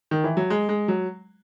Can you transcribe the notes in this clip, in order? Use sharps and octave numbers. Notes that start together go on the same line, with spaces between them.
D#3
E3
F#3
G#3
G#3
F#3